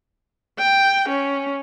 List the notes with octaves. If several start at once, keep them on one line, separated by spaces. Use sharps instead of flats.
G5
C#4